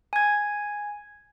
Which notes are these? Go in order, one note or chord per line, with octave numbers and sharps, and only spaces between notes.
G#5 G#6